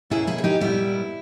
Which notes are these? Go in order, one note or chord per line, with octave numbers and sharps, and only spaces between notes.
B2 A#3 C#4 E4 G#4
E4 G#4
G#4
D#4 G4
A#2 G3 B3 E4